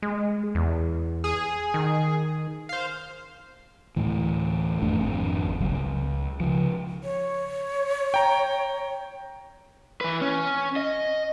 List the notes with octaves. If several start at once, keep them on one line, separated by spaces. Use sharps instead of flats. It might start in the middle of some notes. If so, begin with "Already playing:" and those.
G#3
E2
G#4
D#3
C5 F5
D2 A2 E3
G#1 F2 A3 D4
G#1 F2 C4 D4
G1 C#2 F#3 C4
C#2
C#3 F3
C#5
G5 A#5
E3 B4
C#4
D#5